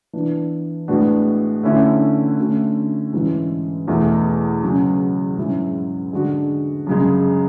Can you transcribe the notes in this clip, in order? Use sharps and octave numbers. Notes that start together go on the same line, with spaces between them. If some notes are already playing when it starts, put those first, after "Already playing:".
E3 B3 D4
A2 G#3 B3 D4 F#4
D3 A3 C#4 E4
D3 A3 C#4 F#4
G#2 E3 G#3 C#4 E4
E2 B2 A3
C#3 F#3 C#4
G#2 F#3 C#4 E4
D3 G#3 D4 F#4
F#2 C#3 G#3